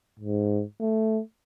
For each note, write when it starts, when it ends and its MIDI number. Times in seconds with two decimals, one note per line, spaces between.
0.20 0.63 44
0.80 1.20 57